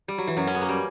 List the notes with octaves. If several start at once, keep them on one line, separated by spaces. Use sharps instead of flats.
G3
F#3
E3
F#2 F#3
C#4
B3
A#3
G3